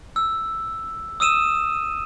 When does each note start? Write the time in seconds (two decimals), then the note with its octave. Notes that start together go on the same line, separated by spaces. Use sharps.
0.16 E6
1.20 D#6 E6 D#7 E7